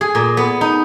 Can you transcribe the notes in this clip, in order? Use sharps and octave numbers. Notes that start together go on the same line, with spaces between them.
G#4
A#2
B3
D#4